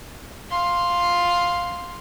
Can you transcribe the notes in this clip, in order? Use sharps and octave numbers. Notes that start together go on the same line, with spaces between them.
F5 C6